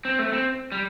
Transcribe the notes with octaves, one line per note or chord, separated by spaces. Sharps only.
C4
A3
C4
G3